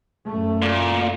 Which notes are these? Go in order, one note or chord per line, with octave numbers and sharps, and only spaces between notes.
F#2 A3
A#2